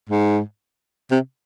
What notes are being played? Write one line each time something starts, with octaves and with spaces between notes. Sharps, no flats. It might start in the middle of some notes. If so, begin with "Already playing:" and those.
G#2
C3